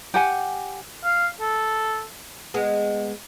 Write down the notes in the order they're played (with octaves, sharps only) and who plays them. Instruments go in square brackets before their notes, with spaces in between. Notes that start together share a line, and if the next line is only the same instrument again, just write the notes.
[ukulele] G4 F#5 G#5
[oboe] F5
A4
[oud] G#3 B3